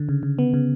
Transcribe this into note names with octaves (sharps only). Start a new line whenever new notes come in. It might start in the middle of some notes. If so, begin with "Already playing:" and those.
Already playing: D3
C#3
C#3
B3
C#3